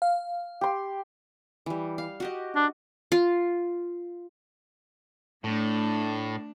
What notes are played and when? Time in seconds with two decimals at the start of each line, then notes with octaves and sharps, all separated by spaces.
0.02 F5
0.61 G4 C6
1.66 E3 G3
1.98 F5
2.20 F#4 G4 D#5
2.55 D4
3.12 F4
5.44 A2 A3 D4